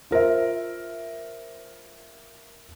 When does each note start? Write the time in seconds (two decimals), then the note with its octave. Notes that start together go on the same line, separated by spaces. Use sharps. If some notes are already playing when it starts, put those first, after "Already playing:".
0.11 F4 A#4 C5 E5